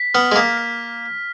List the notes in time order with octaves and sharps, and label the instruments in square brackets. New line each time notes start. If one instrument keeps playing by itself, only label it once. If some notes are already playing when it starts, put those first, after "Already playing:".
Already playing: [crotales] B6
[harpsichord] B3 [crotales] F6
[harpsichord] G#3
[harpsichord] A#3 [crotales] B6
[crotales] B6